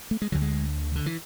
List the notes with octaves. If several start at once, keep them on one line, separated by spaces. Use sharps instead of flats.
A3
G#3
D2 D3 F#3
G#3
D3
E3